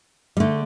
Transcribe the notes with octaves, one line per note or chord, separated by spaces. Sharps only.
G3
D3 A3